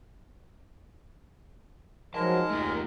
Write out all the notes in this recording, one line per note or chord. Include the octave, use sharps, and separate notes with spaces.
F3 F#3 G#3 D#4 A#4 A5
D#2 A3 F4